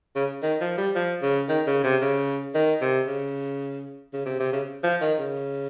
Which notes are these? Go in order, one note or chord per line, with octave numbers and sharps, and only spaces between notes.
C#3
D#3
F3
G3
F3
C#3
D#3
C#3
C3
C#3
D#3
C3
C#3
C#3
C3
C3
C#3
F3
D#3
C#3